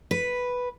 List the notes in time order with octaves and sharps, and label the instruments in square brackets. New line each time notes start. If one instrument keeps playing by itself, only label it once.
[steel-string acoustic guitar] B4